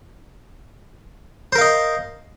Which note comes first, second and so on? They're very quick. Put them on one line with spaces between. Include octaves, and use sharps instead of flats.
C5 A#4 F5 D#5